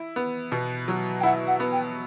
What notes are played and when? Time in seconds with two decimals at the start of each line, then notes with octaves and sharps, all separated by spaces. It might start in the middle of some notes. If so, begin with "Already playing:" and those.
Already playing: E4
0.16 B3
0.52 B2
0.88 F#3
1.20 G5
1.23 E4 F#5
1.47 F#5
1.60 B3
1.72 G5